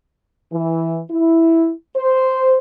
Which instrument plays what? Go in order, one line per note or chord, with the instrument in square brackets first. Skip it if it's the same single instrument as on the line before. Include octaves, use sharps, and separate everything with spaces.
[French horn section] E3
E4
C5